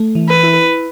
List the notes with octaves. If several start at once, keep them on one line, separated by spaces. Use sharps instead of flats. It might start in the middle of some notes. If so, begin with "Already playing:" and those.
Already playing: A3
E3
B4
E4